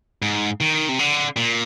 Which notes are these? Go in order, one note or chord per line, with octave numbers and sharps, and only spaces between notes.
G#2
D#3
C3
D3
A#2